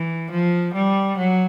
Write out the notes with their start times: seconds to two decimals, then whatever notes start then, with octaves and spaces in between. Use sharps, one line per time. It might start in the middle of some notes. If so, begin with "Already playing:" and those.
Already playing: E3
0.31 F3
0.74 G3
1.18 F#3